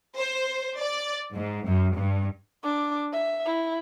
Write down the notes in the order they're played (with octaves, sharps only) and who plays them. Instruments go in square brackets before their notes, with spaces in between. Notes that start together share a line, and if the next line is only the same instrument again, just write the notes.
[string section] C5
D5
G#2
F#2
G2
[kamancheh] D4 D6
E5
E4